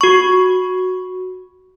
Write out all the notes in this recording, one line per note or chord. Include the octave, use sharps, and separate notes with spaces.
F#4 C#6